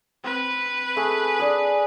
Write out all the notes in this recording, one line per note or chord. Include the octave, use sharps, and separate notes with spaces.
C4 B4
A3 G#4
D4 G#4